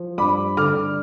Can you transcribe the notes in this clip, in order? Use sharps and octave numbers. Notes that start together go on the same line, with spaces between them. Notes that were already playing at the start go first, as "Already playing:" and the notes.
Already playing: F3
G2 B5 D6
D3 D6 F6